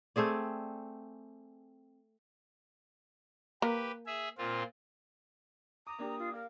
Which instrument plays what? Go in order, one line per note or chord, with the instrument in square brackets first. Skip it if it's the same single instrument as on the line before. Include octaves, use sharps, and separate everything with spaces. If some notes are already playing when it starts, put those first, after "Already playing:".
[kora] A3 C4 G#4 D5
[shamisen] A#3 A#4 [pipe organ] G4 B4
[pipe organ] G#4 E5
A#2 C4 F4
[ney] A#5 [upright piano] D6 [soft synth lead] D#6
[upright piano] A#3 D4 G4
[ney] F4
[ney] A#4 [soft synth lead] F5